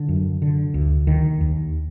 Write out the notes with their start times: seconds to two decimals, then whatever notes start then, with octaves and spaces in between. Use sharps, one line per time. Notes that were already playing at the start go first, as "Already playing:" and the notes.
Already playing: D3
0.09 F#2
0.42 D3
0.74 D2
1.07 D#2 D#3
1.41 D#2